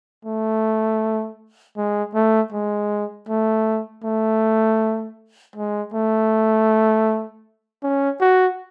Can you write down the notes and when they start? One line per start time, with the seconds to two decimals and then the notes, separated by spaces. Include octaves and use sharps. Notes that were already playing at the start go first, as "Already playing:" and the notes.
0.25 A3
1.77 G#3
2.15 A3
2.52 G#3
3.29 A3
4.04 A3
5.56 G#3
5.94 A3
7.83 C#4
8.21 F#4